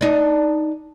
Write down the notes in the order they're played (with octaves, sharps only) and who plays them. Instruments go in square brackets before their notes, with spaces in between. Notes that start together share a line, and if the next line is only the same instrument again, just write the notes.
[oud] D4 D#4